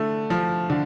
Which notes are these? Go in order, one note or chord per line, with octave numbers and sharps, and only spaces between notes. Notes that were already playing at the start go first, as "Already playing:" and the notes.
Already playing: D3 A3
F3
D3